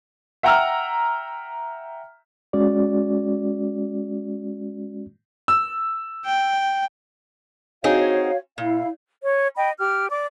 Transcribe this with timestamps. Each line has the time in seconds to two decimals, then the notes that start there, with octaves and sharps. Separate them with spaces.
0.43 E5 F#5 G5 A#5 E6 F6
2.53 G#3 C#4 F#4 D5
5.48 E6
6.26 G5
7.84 C4 D#4 F#4 G#4 C#5 F5
8.58 A#2 E4 F5
9.22 C#5
9.57 D#5 G5 B5
9.79 G4 F6
10.10 D5 D6